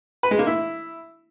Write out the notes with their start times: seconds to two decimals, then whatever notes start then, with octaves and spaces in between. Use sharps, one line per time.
0.23 B4
0.31 G#3
0.39 A#3
0.47 E4